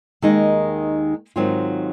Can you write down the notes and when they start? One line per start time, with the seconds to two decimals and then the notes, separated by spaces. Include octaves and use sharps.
0.22 D#2 D#3 G#3 D#4
1.36 G#2 D#3 F#3 C4 F4